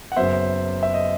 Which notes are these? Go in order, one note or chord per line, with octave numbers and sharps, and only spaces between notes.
F#5
F#1 F#2 F#3 B3 C5 E5
E5
D#5